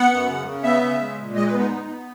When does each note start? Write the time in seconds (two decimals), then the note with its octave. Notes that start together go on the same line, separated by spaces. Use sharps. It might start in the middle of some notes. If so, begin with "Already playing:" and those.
Already playing: B3 F#5
0.11 F#2
0.29 C#3
0.46 C#3
0.64 B3 E5
0.82 C#3
0.99 G#3
1.18 A#2
1.35 G#3 D#5
1.47 B4
1.53 B3
1.59 D#4
1.70 B3
1.88 B3